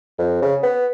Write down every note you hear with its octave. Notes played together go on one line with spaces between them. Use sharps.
F2
C#3
B3